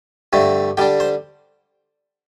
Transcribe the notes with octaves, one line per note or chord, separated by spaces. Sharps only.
G2 D3 A3 C4
D3 G3 D4 G5
C5